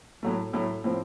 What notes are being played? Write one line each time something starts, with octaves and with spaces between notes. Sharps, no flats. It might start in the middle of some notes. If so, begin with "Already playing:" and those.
A2 F#3 A3
A2 F#3 A3
A2 F3 C4